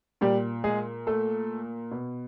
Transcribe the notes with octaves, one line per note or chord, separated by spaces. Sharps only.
A#2 G3 G4
G#3 G#4
A3 A4
B2